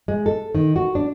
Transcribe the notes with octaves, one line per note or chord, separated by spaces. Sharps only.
G#3
A4
D#3
F#4
D4